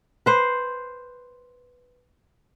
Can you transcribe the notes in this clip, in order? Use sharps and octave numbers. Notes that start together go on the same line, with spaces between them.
B4 C5